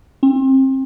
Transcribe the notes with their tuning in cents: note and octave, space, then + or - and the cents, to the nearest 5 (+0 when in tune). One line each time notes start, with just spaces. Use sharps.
C4 +30